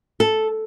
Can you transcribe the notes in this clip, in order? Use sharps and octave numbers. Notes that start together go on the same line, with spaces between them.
A4